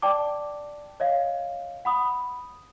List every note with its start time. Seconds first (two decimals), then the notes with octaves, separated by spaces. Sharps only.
0.02 D5 G5 A5 D6
1.00 C#5 D#5 F5
1.85 F#5 B5 D#6